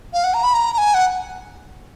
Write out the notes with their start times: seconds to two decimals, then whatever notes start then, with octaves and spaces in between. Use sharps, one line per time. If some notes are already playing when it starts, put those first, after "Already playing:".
0.13 F5
0.24 F#5
0.34 A#5
0.43 B5
0.54 A#5
0.74 A#5
0.78 G#5
0.94 F#5